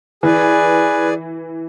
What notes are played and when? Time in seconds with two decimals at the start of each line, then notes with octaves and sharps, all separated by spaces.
0.23 E3 G#4 B4 D5 G#5